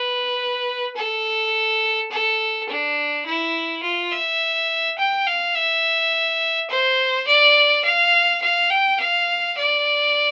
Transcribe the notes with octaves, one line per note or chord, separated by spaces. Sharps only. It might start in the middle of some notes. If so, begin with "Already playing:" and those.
Already playing: B4
A4
A4
D4
E4
F4
E5
G5
F5
E5
C5
D5
F5
F5
G5
F5
D5